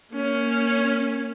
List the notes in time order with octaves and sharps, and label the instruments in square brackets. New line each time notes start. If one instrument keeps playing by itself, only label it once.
[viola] A#3 C#4